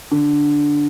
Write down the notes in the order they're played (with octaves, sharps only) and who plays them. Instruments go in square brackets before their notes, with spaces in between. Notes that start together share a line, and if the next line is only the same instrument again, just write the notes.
[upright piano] D3